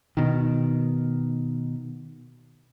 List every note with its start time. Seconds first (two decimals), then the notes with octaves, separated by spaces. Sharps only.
0.17 B2 D#3